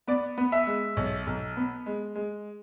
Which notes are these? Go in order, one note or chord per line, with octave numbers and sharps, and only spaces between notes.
B3 D5
B3
E5
G#3
B1
B1
B3
G#3
G#3